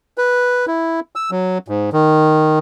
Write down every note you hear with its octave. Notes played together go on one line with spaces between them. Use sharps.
B4
E4
E6
F#3
G#2
D#3